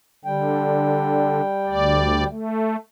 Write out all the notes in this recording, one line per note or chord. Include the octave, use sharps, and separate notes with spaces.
D3 G3 G5
D2 D5
A3